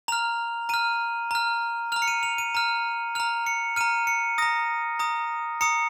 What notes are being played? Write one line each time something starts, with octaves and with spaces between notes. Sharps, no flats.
A#5 F6 F7
A#5 F6 D#7
A#5 F6
A#5 F6 F7
C#7
D#7
F7
D#7
A#5 F6
A#5 F6 F7
C#7
A#5 F6 D#7
C#7
A#5 D#6 A#6
A#5 D#6
A#5 D#6 C#7